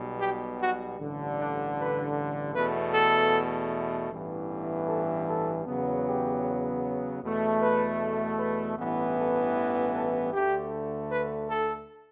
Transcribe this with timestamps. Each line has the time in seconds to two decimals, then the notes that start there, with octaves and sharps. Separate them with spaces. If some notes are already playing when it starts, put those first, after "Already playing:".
Already playing: B1 B2 G3
0.21 G4
0.60 F#4
0.98 A1 G2 D3
1.39 D4
1.77 B4
2.55 E2 B2 A3 B4
2.93 A4
4.11 A1 G2 E3 B3
4.89 A4
5.27 A4
5.66 E2 C#3 F#3 B3
6.06 G4
7.22 E2 B2 A3
7.61 B4
8.39 B4
8.78 A1 G2 E3 B3
9.17 A4
9.95 A4
10.33 D2 D3 A3 G4
11.12 B4
11.50 A4